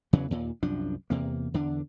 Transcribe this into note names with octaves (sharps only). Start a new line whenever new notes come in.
E2 C#3 E3 F#3
D#2 A#2
C2 F#2 F3 D4
E2 C3 A#3
E2 D3 D4